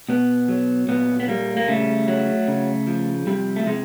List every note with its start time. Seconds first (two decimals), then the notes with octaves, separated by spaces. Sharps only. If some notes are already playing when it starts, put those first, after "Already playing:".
0.09 B2 B3
0.48 F#3
0.88 A#2 B3
1.20 B3
1.28 G3 A#3
1.57 A#3
1.68 C#3 A3
2.08 F#3
2.48 C#3
2.87 F3
3.27 C3 G3
3.56 A3
3.66 C3 G#3